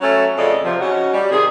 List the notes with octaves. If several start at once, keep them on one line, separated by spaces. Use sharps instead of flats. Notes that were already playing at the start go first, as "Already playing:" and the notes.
F#3 A3 C#4
F2 C#3 A3 D5 D#5
C3 F3
C#3 C#4 D#4 F#4
G3
C3 D#3 G#4